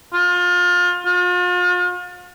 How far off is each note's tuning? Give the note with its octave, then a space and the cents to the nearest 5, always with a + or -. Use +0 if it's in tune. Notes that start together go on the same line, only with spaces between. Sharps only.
F4 +30
F4 +40